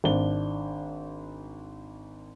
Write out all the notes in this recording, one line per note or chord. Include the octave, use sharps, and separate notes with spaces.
G#1 D4 G7